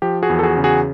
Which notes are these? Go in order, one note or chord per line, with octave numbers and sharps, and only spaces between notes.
F3 G4
F#4 G#4
E2
A4
F#4 G#4
C#3
F#4 G#4